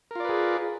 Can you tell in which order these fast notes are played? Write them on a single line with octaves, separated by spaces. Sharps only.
A#4 F4 D5 B4 G#4